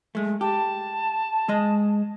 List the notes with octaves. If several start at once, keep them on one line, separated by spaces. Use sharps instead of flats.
G#3 A3
G4 A5
G#3 D#5